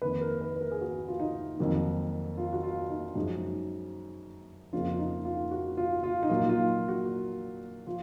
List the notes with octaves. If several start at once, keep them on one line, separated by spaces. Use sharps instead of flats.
F2 D#3 A#3 B4
A#4
B4
B4
A#4
G#4
F#4
F4
D#4
F2 D#3 F#3 A#3
F4
F#4
F4
D#4
F#2 F3 G#3 D#4
F2 C#3 F3 A#3 F4
F4
D#4
F4
F#4
F4
F4
D#4
A#2 F#3 A#3 F4
F4
F#4
F3 F4